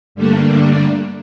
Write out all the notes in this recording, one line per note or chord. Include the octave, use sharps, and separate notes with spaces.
G2 D3 G3 A3 A#3 D4